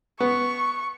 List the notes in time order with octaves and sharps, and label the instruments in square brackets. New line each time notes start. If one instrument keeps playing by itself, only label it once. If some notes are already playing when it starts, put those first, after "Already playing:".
[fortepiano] B3 [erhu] C#6